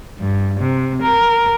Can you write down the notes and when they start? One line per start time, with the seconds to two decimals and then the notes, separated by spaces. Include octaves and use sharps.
0.20 G2
0.60 C3
1.02 A#4